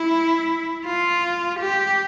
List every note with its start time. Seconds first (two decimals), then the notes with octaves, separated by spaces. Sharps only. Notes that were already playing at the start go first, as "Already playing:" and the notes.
Already playing: E4
0.86 F4
1.60 G4